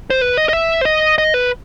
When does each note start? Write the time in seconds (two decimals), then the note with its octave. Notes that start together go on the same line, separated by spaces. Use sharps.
0.10 C5
0.21 B4
0.37 D#5
0.49 D#5
0.53 E5
0.81 C5
0.85 D#5
1.18 D#5
1.34 B4